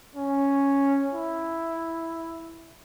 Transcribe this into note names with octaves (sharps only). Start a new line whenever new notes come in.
C#4
E4